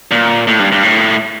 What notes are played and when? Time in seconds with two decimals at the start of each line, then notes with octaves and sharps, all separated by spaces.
0.11 A#2
0.47 A2
0.59 G2
0.72 G2
0.83 A2